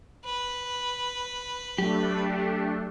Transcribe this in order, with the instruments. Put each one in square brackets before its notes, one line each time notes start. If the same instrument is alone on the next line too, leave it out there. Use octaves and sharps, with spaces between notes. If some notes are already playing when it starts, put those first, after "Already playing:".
[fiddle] B4
[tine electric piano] F#3 [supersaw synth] A3 D4 [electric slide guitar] G4